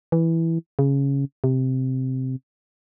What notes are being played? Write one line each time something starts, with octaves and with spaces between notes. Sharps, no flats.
E3
C#3
C3